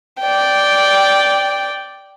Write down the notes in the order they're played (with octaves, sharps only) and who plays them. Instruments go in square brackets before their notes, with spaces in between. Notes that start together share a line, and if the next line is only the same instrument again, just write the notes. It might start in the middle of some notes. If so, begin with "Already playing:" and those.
[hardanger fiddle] D5 G5